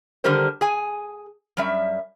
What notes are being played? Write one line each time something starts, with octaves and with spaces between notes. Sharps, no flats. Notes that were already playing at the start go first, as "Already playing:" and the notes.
D3 D#3 G3 G4 A#4 C5
G#4 G#5
F#2 G3 E5